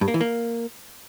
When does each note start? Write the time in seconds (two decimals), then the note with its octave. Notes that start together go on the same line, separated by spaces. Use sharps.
0.01 G2
0.08 A#3
0.14 E3
0.21 A#3